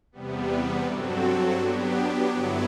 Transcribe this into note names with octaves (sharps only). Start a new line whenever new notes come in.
E2 C3 G3 B3
G2 F#3 C4 F#4 A4
F#3 B3 D4 G4
G2 D3 F#3 B3 E4